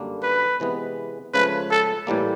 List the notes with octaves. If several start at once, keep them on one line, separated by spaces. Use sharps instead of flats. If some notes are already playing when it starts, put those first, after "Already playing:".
Already playing: F#2 D3 G3 A#3 D4
B4
C3 E3 G#3 B3
C#2 C#3 F3 A3 B4
A4
A2 E3 G3 A#3